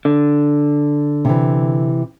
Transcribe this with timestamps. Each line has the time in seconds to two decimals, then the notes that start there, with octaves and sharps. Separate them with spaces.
0.05 D3
1.25 C3 E3